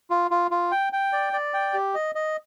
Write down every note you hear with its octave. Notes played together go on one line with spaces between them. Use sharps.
F4
F4
F4
G5
G5
D5
D5
G5
G4
D#5
D#5